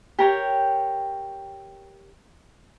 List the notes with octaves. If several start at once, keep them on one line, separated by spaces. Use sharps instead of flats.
G4 A#4 C#5 G5